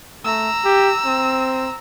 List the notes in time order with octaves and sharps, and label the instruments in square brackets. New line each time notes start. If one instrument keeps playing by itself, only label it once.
[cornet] A3 [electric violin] A#5 E6
[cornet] G4
C4